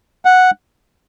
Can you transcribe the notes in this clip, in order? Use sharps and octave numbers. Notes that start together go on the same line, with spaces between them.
F#5